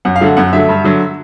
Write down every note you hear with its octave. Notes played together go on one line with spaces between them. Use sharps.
F#2 F#5
F5
D3 F#3 A3
F#5
F#2 F#5
D3 F#3 A3 E5
G2
D3 F#3